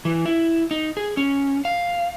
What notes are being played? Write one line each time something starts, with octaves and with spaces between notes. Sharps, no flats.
E3
E4
D#4
G#4
C#4
F5